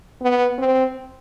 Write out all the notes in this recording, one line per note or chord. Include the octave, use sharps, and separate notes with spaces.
B3
C4